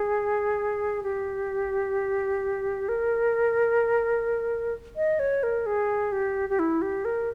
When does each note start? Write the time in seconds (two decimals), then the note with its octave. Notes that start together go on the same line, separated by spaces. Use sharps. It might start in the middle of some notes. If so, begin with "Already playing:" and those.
Already playing: G#4
1.03 G4
2.89 A#4
4.96 D#5
5.19 C#5
5.43 A#4
5.66 G#4
6.12 G4
6.50 G4
6.59 E4
6.82 G4
7.05 A#4